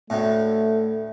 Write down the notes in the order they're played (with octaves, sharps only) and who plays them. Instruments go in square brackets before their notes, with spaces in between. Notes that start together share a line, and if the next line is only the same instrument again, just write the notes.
[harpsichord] D2 A2 [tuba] A3